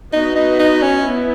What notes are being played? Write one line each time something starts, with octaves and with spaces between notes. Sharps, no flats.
B3 D#4 F#4 B4 D#5
D#4
D#4
C#4
B3 E4